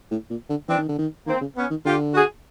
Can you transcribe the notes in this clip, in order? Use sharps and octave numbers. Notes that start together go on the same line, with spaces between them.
A2
A#2
D3
E3 C4 D4
D#3
D3
D#3
D#3 A#3 C4
C#3
B3 C#4
D#3
D3 F4 G4
F#4 G#4